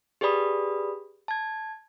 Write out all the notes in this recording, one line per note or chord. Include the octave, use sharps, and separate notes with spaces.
G4 G#4 B4 D5 B5 D#6
A5 G#6